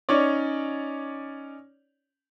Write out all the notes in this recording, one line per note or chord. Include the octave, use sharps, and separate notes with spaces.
C#4 D#4 C#5 D5